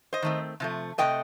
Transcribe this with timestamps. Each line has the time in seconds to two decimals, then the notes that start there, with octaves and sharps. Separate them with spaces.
0.13 C5 D#5
0.22 D#3 A3 C4
0.60 C3 F3 A3
0.98 C3 F3 A3 D#5 G5